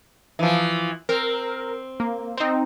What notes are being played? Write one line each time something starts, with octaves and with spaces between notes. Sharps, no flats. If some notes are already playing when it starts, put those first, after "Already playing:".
E3 F3
C4 A#4
A#3
C4 D#4